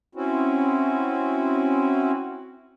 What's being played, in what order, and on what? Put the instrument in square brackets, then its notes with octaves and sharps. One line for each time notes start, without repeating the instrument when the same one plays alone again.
[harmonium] C4 C#4 E4 F#4